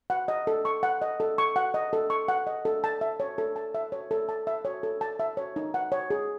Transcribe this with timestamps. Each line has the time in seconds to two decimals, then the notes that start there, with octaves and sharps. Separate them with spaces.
0.10 F#5
0.28 D#5
0.47 A4
0.65 C#6
0.83 F#5
1.02 D#5
1.20 A4
1.38 C#6
1.56 F#5
1.74 D#5
1.93 A4
2.10 C#6
2.28 F#5
2.47 D#5
2.65 A4
2.84 A5
3.01 E5
3.20 C#5
3.38 A4
3.56 A5
3.75 E5
3.92 C#5
4.11 A4
4.29 A5
4.47 E5
4.65 C#5
4.83 A4
5.01 A5
5.20 E5
5.37 C#5
5.56 D#4
5.74 F#5
5.92 C#5
6.10 G#4